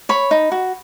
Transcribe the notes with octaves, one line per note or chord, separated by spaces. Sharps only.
C#5 B5
D#4
F#4